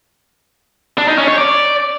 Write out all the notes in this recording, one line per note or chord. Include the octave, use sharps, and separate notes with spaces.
D4
D#4
C#4
C#5
D5